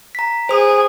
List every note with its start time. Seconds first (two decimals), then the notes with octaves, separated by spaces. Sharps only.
0.15 A#5 B6
0.49 G#4 C5 D#6